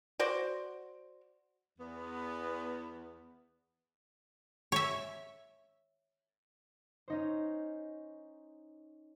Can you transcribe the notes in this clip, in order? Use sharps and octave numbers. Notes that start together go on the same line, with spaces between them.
F#4 C5 D5
E2 B3
C#5 E5
C#4 D#4 C5